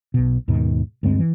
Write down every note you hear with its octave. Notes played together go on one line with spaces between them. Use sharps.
B1 B2
D#2 G#2 B2 D#3
D2 G2 G#3 C4
E3